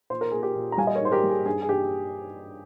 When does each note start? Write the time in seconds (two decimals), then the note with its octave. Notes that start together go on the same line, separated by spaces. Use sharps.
0.10 A#2 C5
0.21 A#4
0.32 A#2 G#4
0.42 G4 A#4
0.55 A#2
0.72 A#5
0.78 G3 F5 G#5
0.87 D#5
0.95 A#4 C#5
1.01 G#2 C5
1.12 G4 A#4
1.23 G3
1.30 G#4
1.46 G2 G#4
1.62 G#4
1.68 G2 G4